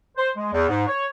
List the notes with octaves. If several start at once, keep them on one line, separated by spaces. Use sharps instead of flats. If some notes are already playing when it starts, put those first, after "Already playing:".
C5
G#3
E2
G#2
C#5